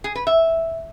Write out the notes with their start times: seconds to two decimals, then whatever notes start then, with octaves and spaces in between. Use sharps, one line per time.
0.04 G#4
0.15 B4
0.27 E5